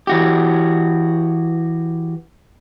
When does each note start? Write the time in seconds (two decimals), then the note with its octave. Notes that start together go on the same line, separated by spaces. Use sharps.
0.07 E3 F#4 G4